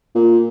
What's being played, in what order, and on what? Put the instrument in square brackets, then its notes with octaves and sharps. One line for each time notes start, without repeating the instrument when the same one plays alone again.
[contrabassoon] A#2